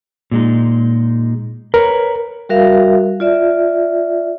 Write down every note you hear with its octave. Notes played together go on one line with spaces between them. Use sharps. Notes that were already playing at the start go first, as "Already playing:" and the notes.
A#2 G#3 D#4
A#4 B4 C#5
G3 F#4 A#4 E5 F5
F4 D5 E5